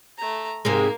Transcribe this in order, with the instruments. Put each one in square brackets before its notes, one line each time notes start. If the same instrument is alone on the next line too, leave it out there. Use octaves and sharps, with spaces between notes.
[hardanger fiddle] A3 A#5
[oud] G#2 C3 G#3 [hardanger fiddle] A#3